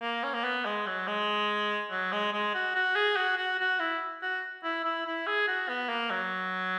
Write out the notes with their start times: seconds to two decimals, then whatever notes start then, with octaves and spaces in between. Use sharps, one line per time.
0.02 A#3
0.24 C#4
0.34 A#3
0.44 B3
0.65 G#3
0.87 F#3
1.08 G#3
1.91 F#3
2.12 G#3
2.33 G#3
2.54 F#4
2.75 F#4
2.96 G#4
3.16 F#4
3.37 F#4
3.59 F#4
3.80 E4
4.22 F#4
4.64 E4
4.84 E4
5.06 E4
5.27 G#4
5.48 F#4
5.69 B3
5.89 A#3
6.10 F#3